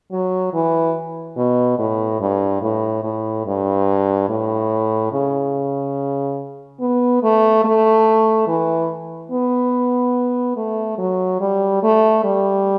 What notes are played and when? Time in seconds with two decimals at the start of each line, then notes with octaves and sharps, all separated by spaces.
0.11 F#3
0.53 E3
1.37 B2
1.78 A2
2.20 G2
2.62 A2
3.04 A2
3.46 G2
4.29 A2
5.12 C#3
6.80 B3
7.23 A3
7.64 A3
8.47 E3
9.31 B3
10.56 A3
10.98 F#3
11.40 G3
11.83 A3
12.24 G3